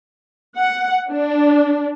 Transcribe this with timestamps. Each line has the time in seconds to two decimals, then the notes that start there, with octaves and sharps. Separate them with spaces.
0.57 F#5
1.11 D4